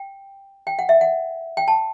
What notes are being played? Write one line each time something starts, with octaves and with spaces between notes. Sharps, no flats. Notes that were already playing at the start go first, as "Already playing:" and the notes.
Already playing: G5
G5
F#5
E5
F#5
G5
A5